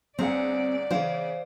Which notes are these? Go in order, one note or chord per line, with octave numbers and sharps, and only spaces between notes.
G1 C4 G#4 D5 F#5
C#3 E3 C5 F5